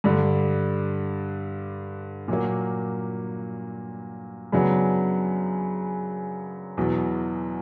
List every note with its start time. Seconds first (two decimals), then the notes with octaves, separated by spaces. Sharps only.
0.04 G2 D3 G3
2.28 A#2 F#3 A#3
4.52 F#2 C#3 F#3 B3 D4
6.77 E2 B2 F#3